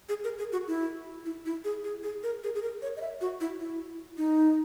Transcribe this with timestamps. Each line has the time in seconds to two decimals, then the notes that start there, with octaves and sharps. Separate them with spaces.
0.09 G#4
0.24 A#4
0.38 G#4
0.52 F#4
0.67 E4
1.25 E4
1.46 E4
1.65 G#4
1.84 G#4
2.03 G#4
2.23 A#4
2.43 G#4
2.55 G#4
2.62 A#4
2.82 C#5
2.97 D#5
3.01 E5
3.21 F#4
3.41 E4
3.60 E4
4.18 D#4